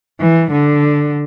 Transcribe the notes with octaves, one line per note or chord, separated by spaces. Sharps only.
E3
D3